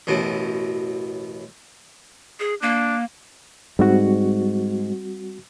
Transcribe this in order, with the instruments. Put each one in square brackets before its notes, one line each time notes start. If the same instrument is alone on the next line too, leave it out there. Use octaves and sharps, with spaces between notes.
[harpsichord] A1 F#2 B2 E3
[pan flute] G#4
[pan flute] A#3 [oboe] D4
[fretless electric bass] G#2 [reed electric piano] G3 C4 F#4